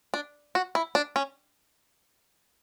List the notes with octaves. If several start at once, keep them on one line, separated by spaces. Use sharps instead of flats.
D4
F#4
E4
D4
C#4